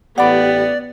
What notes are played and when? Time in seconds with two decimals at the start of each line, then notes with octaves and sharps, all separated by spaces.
0.18 A1 B3 G4 D5 F#5 B5